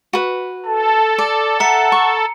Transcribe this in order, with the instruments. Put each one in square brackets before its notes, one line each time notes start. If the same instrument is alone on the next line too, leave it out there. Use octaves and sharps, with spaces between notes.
[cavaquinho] F#4 B4
[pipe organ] A4 [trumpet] A5
[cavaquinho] D5
[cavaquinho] E5 [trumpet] F#5 [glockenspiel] A#5 C#7
[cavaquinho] C#6